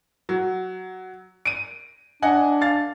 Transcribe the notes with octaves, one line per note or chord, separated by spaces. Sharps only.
F#3
D7 D#7
D4 D#5 F#5 G#5
F5 A6